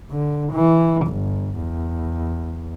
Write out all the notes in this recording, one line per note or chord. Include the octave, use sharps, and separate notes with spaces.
D3
E3
G1
E2